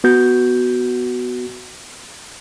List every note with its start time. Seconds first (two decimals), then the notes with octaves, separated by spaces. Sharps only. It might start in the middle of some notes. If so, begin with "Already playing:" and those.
0.04 B3 F#4 G6